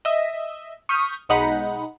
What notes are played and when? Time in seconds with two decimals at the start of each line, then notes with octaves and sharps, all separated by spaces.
0.05 D#5 E5
0.89 C#6 D#6 F6 G6 B6
1.29 B1 G#3 D#4 F#5 B5